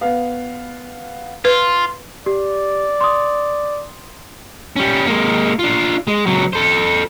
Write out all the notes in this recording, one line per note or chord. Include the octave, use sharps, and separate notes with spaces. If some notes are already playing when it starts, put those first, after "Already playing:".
B3 F5
F4 B4
G4 D5
C6 D#6
G3 C#4
G#3 A#3
D4 F4
G#3
C#2 F#3
A4 C5